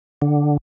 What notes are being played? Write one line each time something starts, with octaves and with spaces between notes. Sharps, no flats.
D3